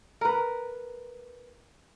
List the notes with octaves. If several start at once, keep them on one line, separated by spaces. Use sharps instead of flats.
A#4 B4